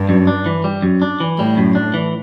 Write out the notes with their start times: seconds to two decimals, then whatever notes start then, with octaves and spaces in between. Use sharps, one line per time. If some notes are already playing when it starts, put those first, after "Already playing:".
Already playing: G2
0.09 F#2
0.27 D4
0.46 E3
0.64 G3
0.82 F#2
1.02 D4
1.20 E3
1.39 A2 G3
1.57 F#2
1.75 D4
1.94 E3